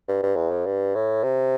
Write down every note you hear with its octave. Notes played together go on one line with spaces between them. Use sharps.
G2
G2
E2
F2
G2
A2
C3